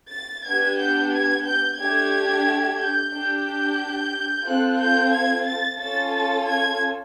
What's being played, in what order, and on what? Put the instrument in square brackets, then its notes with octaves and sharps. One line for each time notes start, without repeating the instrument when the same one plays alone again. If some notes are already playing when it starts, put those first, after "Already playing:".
[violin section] A6
B3 D4 G4 G#6
G6
G#6
G6
A3 D4 G4 G#6
G6
D4 G4
G6
C4 F4 A4 F#6
G6
G#6
A6
C#4 F4 A4 A6
A6
G#6